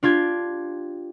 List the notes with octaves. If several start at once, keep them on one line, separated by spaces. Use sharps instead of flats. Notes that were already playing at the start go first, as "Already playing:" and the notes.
D4 F4 G4 G#6